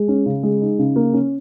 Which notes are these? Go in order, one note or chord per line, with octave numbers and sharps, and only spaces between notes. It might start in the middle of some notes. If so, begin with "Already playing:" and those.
Already playing: G#3
C#4
C#3
G#3
D#4
C#3
A#3
C#4